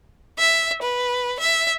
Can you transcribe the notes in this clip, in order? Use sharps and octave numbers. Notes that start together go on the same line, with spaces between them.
E5
B4
E5